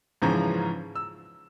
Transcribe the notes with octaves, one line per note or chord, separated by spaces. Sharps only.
G#2 C#3 E3 F3 C#4 A#5
E6